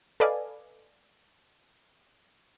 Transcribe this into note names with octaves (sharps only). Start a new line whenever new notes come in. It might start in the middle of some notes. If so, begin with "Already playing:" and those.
A4 B4 D5 D#5 F5 G#5